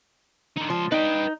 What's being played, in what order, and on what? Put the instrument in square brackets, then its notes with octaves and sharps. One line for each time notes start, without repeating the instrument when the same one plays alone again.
[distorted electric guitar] D3 D#4
[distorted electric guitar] C#2 C6 [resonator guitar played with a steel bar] F3
[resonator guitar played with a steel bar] D#4 [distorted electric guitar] B4 G5